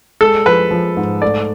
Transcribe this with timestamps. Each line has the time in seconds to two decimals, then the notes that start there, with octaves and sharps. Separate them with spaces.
0.21 G#3 A4
0.46 F3 B4
0.71 F3
0.97 G#2
1.22 A3 D5